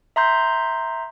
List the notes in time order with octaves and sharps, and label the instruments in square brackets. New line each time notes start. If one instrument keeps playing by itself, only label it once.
[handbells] E5 A#5 C6 G6